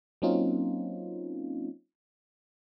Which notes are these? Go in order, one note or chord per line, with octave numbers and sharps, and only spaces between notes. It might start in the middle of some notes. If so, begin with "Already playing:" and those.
F#3 A#3 C4 C#4 D#4 F4